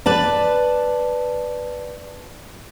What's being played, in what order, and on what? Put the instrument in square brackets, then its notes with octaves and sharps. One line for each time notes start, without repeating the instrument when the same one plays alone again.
[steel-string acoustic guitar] B4 D5 A5